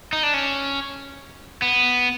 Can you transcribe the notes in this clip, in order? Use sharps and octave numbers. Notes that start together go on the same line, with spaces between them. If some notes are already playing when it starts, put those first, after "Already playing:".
D#4
D4
C#4
B3